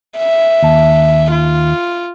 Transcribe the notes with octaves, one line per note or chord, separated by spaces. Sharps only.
E5
D#2 A5
F4